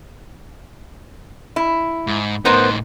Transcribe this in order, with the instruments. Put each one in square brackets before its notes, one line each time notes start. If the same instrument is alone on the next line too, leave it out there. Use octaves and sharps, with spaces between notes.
[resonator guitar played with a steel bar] E4
[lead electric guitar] G#2
[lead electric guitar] A2 D#4 [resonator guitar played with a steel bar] B3 A#4 C5